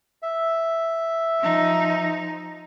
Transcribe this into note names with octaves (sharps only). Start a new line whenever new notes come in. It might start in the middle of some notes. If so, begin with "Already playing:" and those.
E5
F3 D#4